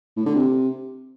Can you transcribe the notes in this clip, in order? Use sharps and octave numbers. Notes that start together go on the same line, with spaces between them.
A2
D3
C3